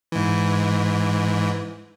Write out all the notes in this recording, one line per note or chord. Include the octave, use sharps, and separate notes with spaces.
G#2 E3